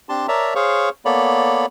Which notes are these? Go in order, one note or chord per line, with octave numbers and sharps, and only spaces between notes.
C4 D4 G4 A5 C6
A#4 C#5 D5 E5 A5 A#5
G#4 C5 C#5 F5 C#6
A#3 B3 A4 C#5 D5 B5